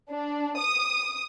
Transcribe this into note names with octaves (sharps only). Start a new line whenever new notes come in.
D4
D#6